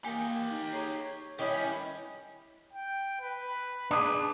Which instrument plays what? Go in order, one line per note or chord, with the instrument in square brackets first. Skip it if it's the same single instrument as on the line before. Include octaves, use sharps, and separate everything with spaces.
[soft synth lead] A#3 [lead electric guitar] G4 D#5 [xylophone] G#5 C#7
[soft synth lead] D#4
[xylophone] G#4 A#5 C7 [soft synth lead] C#5
[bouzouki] D#3 C#4 [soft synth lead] E4 [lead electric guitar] G4 B4
[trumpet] G5
B4
[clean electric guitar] D4 G#4